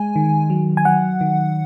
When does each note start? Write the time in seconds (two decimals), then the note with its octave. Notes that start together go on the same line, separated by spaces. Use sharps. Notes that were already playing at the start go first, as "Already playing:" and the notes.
Already playing: G#3 G#5
0.16 D#3
0.50 F#3
0.77 G#5
0.85 F#3 F#5
1.21 D#3